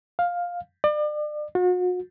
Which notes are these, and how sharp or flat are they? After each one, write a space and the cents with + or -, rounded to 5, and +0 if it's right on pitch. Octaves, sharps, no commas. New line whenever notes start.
F5 +10
D5 +35
F#4 -40